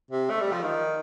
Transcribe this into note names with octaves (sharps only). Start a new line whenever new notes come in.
C3
A3
G3
F3
D#3